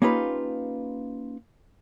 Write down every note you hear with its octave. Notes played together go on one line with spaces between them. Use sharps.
A#3 C#4 D#4 F4 G4 B4